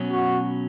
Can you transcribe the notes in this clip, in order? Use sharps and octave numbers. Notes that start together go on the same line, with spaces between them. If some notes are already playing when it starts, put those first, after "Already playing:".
Already playing: B2 F#3 C#4
F#4